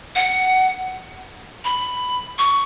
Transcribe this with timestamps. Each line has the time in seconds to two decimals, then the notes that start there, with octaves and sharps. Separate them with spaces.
0.16 F#5
1.64 B5
2.39 C#6